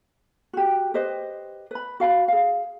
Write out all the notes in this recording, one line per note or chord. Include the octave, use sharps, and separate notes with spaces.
F#4 G4
G4 B4 C5 D#5
B4 B5
F#4 F5 G#5 B5
G#4 F5